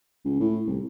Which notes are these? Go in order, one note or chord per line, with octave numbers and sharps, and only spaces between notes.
C#2
A2
C2